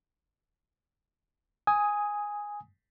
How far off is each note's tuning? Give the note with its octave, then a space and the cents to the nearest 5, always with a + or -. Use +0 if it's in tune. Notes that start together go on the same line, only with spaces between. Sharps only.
G#5 -5 D#6 +10